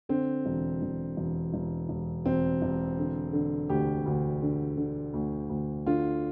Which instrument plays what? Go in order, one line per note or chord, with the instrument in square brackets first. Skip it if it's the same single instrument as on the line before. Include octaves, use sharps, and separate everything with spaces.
[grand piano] D3 C4
E1
E1
E1
E1
E1
E1 C4
E1
D3
D3
D2 G4
D2
D3
D3
D2
D2
D3 F4